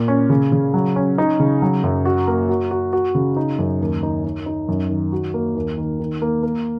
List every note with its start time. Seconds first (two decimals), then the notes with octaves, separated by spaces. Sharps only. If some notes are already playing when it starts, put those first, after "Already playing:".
Already playing: A#2
0.08 C#4
0.30 C#3
0.52 C#3
0.74 F#3
0.96 C#4
1.18 D#4
1.40 C#3
1.62 F#3
1.84 F#2
2.05 F#4
2.27 A#3
2.49 F#4
2.71 F#4
2.93 F#4
3.15 C#3
3.36 D#4
3.59 F#2
3.81 D#2
4.03 D#4
4.25 D#4
4.46 D#4
4.68 F#2
4.89 D#3
5.12 F#4
5.34 A#3
5.55 D#2
5.78 D#3
6.00 D#3
6.22 A#3
6.43 A#3